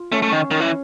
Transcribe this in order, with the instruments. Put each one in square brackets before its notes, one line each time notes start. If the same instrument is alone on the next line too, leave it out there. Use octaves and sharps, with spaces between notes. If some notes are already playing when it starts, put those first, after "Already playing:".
Already playing: [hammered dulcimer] F4
[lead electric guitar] A3 [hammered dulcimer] C#4
[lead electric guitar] A3
D#3
D#3
E3